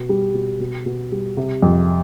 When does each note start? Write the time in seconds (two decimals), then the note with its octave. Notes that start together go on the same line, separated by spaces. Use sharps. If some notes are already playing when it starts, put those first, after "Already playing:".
Already playing: B2
0.09 G3
0.34 B2
0.60 B2
0.86 B2
1.12 G3
1.37 C3
1.62 F2